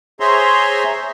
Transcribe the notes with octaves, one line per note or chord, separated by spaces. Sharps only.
G#4 C5 C#5 E5 A#5 C6